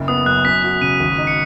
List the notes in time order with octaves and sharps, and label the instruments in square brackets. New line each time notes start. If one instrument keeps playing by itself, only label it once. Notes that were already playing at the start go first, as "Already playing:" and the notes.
Already playing: [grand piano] F#1 C#3
[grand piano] B3 [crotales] D#6
[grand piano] F#2 [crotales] F#6
[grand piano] F#2 [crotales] B6
[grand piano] F#4 [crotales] B6
[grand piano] C#3 [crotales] D#7
[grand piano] G#1
D#4
[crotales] C#7